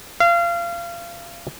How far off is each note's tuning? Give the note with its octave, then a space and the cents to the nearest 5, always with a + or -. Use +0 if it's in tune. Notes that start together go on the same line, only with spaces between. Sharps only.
F5 -30